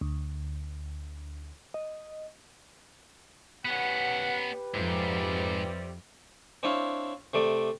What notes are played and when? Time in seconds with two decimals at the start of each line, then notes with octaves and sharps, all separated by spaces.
0.01 D2
1.74 D#5
3.65 B3 C#4 G4 B4 F#5
4.74 F2 G#2 C3 G3
6.63 C4 D4 E4 C#5 F5
7.34 C3 A3 D5